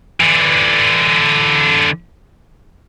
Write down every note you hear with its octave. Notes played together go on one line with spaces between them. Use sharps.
D3 E3